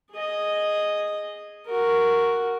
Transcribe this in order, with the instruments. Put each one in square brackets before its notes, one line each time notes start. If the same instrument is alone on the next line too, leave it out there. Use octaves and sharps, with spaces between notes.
[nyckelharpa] G#4 D#5
F#4 A#4